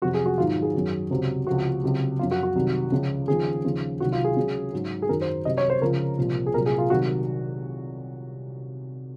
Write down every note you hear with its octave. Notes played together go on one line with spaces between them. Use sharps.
F2 C3 F#3 F#4
G#4
F#4
G#2 D#3 F#3 F4
G#4
F#2 D#3 F#3
C#2 C3 F#3
C#2 C3 F3 F#4
C#2 C3 F#3
F#2 F3 F4
F#4
F#4
C2 C3 D#3 F#3
C#2 C#3 F3
D#2 C#3 F3 G#4
D#2 C#3 F3
C2 C3 D#3 F#3 F#4
F4
G#4
C#2 C#3 F#3
G#2 F#3
G#4
F#2 D#3 F#3 A#4
C5
C2 C3 F#3 D#5
C#5
C5
C#2 C#3 F3 A#4
C2 A#2 F3
G#4
C2 A#2 F#3 A#4
G#4
F4
C2 C3 D#3 F#3 F#4